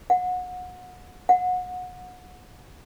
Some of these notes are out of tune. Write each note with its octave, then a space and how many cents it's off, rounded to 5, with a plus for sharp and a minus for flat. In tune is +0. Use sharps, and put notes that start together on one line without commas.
F#5 -25
F#5 -25